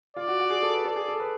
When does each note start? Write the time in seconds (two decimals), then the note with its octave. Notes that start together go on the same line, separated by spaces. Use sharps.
0.16 F4 D5
0.28 F#4
0.40 F#4
0.50 G#4
0.63 A4
0.73 B4
0.85 A4 D5
0.96 G#4
1.08 A4
1.20 B4